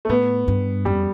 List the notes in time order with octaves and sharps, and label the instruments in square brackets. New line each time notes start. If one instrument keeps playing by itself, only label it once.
[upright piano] A3
[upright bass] A2 [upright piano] B3
[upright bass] G2
[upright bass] F2 [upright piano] G3